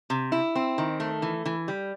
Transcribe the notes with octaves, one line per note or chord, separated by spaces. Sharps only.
C3
E4
C4
D#3
A3
E3
E3
G3